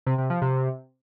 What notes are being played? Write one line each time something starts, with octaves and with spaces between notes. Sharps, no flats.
C3
C3
F3
C3